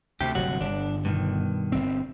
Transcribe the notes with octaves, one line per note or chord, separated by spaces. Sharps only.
D2 C3 G4
G1 C3 F#3 F#4
G1 D4
G2 B2 D#3
G1 C4